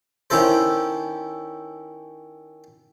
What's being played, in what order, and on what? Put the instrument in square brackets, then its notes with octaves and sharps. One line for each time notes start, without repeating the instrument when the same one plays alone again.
[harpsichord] D#3 C#4 D4 E4 A4 C5